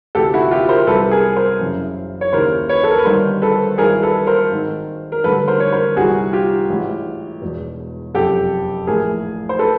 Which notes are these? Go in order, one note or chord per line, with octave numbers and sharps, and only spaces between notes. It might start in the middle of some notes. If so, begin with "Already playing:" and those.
D2 C3 E3 G4 A4
E4 F#4
F4 G4
A#4 C5
C2 C3 E3 A4 B4
G#4 A#4
A#4 C5
F#1 F#2 C#3 E3
C#5
D#2 C#3 E3 A#4 C5
B4 C#5
A4
A#4
B4
G1 G2 D#3 A#4 C5
A4 B4
G#1 G2 E3 G#4 A#4
A4 B4
A#4 C5
G#1 G#2 D#3
A#4
A1 G2 D3 A4 B4
A#4 C5
C#5
A#4 C5
C2 C3 E3 F#4 G#4
F4 G4
A1 G#2 E3
E1 E2 B2
F#1 F2 C3 G4 A4
A#1 A2 E3 G#4 A#4
C5
A4 B4